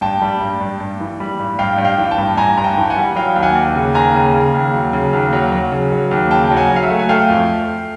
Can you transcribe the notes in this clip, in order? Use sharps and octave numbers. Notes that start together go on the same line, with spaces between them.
G2 G5 A5
G3
G2
G2
G2
E3
G3
G2
G2 F5 G5
G2
F5 G5
E3
G5 A5
G2
G2 G#5 A#5
G2 A#5
G5 A5
E3
F#5 G#5
G3
F#3 F5 G5
D#2
F#5 G#5
D#2
C#3
D#2 G#5 A#5
C#3
C#3
D#2
F#3
C#3
D#2
F#3
F#3
C#3
F#3
D#2
C#3 G5 A5
F#3
F#5 G#5
F#3
F5
E5 F#5
A3
G#5
A3 F5 G5
F2